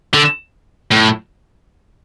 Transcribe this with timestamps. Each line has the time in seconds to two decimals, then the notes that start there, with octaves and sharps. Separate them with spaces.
0.14 D3
0.92 A2